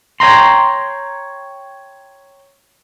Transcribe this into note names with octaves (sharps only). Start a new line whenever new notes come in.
C#5 D#5 G5 A#5 C6